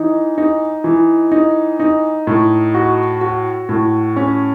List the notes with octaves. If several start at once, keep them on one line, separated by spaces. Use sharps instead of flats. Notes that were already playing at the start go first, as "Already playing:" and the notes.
Already playing: E3 D#4
D#4
E3
D#4
D#4
A2
F#4
F#4
A2
C#4